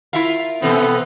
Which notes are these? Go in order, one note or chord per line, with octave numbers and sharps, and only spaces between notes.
E4 F4 A#4 E5 F5
B2 E3 B3 C4 A4